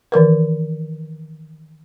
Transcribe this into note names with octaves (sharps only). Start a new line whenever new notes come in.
D#3 E3 A#4 B4